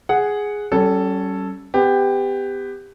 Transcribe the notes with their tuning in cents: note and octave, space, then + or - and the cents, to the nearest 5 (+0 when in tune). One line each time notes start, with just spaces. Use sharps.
G#4 +0 F#5 +0
G3 -40 C#4 +0 A4 +0
B3 +30 G4 +15